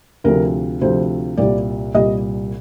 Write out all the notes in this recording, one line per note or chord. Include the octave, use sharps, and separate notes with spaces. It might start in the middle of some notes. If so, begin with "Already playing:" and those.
D2 C3 F3 A#4
D2 C3 F3 C5
C2 A#2 G3 D5
C2 A#2 G3 D#5